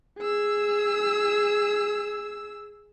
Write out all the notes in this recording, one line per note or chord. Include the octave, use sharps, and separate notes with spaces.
G#4 E6